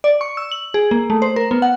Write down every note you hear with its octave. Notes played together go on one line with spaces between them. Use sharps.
D5
C#6
E6
F#7
G#4
A#3
A3
C5
A#4
B3
F#5